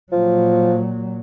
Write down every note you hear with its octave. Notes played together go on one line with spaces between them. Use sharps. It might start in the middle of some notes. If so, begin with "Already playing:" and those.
A#2 F3 F#3